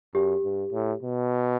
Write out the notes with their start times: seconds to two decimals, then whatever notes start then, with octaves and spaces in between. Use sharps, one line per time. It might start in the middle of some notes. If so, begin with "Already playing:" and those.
0.15 F#2 G4
0.44 G2
0.73 A2
1.03 B2